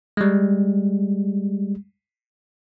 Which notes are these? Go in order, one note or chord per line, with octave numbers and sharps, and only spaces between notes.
G3 G#3